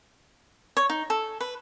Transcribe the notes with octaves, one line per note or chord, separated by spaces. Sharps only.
C#5
D#4
A4
B4